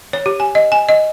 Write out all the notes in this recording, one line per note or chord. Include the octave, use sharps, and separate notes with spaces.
C#5
G4
G#5
D#5
G#5
D#5